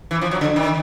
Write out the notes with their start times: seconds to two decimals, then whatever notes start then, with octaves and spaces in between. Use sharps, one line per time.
0.11 E3
0.21 F3
0.31 F#3
0.41 D3
0.56 D#3